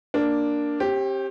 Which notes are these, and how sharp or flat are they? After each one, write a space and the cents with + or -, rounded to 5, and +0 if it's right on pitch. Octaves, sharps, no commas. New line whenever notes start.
A#3 +0 D4 +0
C4 +45 G4 +0